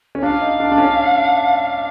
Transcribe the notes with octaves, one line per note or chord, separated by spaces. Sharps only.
C#4
D4 F5
D#4
D4
D4
C#4